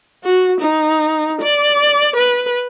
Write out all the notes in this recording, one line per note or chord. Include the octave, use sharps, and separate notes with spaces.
F#4
D#4
D5
B4